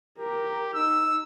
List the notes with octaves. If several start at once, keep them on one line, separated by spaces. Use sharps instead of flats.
G4 A#4
D#4 E6